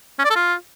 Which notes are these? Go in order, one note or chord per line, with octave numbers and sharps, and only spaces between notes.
C#4
D5
A4
F4